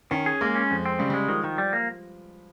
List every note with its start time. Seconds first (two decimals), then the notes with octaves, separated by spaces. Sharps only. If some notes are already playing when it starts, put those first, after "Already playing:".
0.11 D#3 C#4
0.26 G#4
0.41 G#3 A#3
0.55 C#4
0.71 F2
0.86 C4
0.99 C#3 G3
1.10 G3
1.14 G#3
1.29 D#3 F3
1.44 D#3
1.58 G3
1.73 A#3